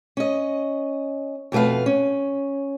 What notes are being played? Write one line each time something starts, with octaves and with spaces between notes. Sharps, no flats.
C#4 D#5
F2 B2 A3 B4 F5
C#4